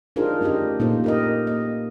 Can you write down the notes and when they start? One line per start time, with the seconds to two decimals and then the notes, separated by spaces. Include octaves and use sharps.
0.16 D4 D#4 F4 G#4 A#4 C5
0.41 A3 C#4 D4 G4 D#5
0.79 A#2 A#3 D#4 F4 A4 C5
1.04 G4 A#4 D#5
1.47 A#3 D#5